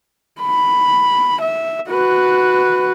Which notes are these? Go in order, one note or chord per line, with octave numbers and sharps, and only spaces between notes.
B5
E5
F#4 B4